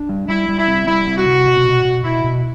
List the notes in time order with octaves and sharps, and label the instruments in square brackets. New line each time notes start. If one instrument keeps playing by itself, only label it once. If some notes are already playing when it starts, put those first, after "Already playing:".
Already playing: [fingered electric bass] D4
G3
[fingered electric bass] G3 [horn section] E4
[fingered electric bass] G3
[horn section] E4
[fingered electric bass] C4
[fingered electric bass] G3 [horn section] E4
[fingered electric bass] C4
[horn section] F#4
[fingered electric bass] C3
B2
B2
B2
[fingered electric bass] B2 [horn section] E4
[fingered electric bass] B2